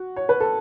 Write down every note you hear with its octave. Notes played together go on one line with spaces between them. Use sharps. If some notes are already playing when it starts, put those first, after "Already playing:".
Already playing: F#4
C#5
B4
A4